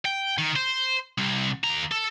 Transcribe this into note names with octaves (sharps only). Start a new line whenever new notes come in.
G5
D#3
C5
C2 C3
D#2 A#5
A4